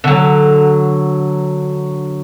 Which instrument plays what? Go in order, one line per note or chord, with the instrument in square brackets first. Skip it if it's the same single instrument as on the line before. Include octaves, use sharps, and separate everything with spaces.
[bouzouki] D3 F#3